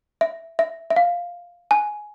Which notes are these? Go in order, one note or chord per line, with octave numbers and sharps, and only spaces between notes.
E5
E5
E5
F5
G#5